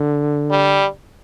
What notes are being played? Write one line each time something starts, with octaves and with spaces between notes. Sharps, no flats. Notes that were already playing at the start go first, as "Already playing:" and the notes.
Already playing: D3
G3